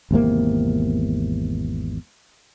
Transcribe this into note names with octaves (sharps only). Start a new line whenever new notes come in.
G#1 E2 C3 A#3